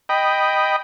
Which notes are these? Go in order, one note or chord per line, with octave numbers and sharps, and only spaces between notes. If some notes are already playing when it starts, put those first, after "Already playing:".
D#5 G5 B5